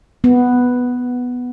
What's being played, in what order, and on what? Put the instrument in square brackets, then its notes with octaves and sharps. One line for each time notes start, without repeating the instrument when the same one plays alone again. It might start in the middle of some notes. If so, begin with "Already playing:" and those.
[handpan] B3